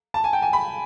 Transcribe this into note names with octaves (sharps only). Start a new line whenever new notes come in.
A5
G#5
G5
G#5
B5